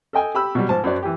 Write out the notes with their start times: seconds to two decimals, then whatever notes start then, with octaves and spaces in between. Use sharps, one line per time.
0.13 A4 D#5 G5 G#5
0.35 G4 B5 E6
0.55 B2 F#3 G3
0.69 G#2 F3 A5
0.84 F#2 F#3 C5 D5
1.03 E3 G4